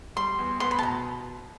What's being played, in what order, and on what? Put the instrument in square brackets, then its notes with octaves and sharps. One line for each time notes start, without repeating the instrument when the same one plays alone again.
[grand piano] G3 [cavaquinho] C6
[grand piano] E2
[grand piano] B3 [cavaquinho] C6
[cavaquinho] B5
A5
[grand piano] B2 [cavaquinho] A#5